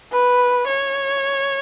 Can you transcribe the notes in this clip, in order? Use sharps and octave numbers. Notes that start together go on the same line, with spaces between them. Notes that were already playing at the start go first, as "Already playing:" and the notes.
B4
C#5